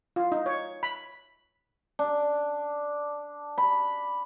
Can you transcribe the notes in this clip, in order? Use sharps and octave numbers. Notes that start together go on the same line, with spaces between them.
F4
D#4
C#5
B5
D4
B5